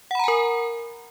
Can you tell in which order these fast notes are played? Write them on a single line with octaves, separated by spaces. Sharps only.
F#5 B5 A#5 G#5 A#4